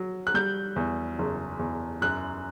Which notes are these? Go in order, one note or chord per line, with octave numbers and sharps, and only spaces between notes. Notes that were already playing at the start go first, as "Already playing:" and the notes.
Already playing: F#3
F#6
G3 G6
E2
F#1
E2
F#2 F#6